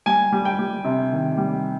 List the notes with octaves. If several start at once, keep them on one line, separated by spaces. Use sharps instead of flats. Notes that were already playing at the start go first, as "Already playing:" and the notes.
G3 G#5
G3
G5
G3
C3
D#3
G3